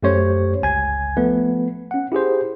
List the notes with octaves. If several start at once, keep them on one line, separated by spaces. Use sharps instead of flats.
F#2 A3 G4 C5 C#5
G1 C#2 G#5 G#6
F3 A3 B3 B4
C#4 F#5
E4 G4 G#4 C5